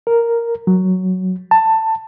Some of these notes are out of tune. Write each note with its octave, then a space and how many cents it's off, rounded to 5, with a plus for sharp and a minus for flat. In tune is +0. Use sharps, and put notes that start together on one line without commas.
A#4 +0
F#3 +5
A5 +15